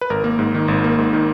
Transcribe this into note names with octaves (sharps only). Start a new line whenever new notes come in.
B4
G#1 A#4
A#3
G#2
D#3
G#1
A#3
G#2
D#3